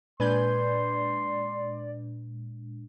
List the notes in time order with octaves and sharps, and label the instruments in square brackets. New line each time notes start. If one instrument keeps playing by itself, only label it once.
[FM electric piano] A#2 G#3 D4 [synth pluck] B4 G#5 G6 [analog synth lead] D5 [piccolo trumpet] C6